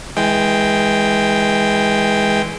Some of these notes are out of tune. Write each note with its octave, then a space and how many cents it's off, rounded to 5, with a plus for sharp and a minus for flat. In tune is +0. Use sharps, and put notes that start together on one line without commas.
E3 -20 G#3 +0 G5 +0